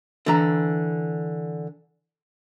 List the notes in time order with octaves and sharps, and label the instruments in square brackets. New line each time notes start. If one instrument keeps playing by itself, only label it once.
[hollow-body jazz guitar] D3 E3 A#5